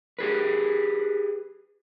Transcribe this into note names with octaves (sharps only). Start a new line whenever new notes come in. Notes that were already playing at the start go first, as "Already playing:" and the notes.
G4 G#4 B4